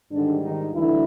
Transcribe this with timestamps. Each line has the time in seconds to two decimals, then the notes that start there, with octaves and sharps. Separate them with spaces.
0.11 G#2 D3 D#3 G3 D4
0.43 D#3 D#4
0.74 D2 D3 E3 G3 E4